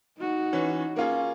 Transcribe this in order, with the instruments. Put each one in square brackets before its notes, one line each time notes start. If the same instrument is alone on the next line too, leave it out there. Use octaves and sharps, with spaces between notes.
[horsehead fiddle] D#4 F#4
[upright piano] E3 C#4
[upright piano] A#3 F4 G#4 [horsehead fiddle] C#4